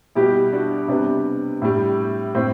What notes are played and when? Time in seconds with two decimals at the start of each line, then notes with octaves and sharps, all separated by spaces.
0.15 B2 G3 E4 G4
0.53 D4 F#4
0.88 C3 G3 B3 D4
1.62 A2 G3
2.35 A2 C4